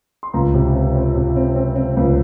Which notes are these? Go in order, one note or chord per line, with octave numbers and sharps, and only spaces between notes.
C6
C#2 A#5
C3
C4
C4
C3
C4
C4
C4
C#2